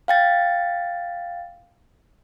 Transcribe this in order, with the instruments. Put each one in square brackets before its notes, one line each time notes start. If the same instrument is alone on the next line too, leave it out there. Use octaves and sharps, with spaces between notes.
[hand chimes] F5 G5 A6